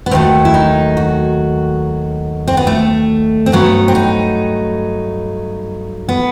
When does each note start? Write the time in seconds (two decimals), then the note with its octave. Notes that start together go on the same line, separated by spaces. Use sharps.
0.06 B3
0.11 D#2 D#3 F#3 A3 C4
0.45 E4
0.54 D#4
0.97 F#4
2.48 C4
2.57 B3
2.67 A3
3.46 C4
3.52 G2 F#3 A3 B3
3.88 C4
3.95 D#4
6.09 B3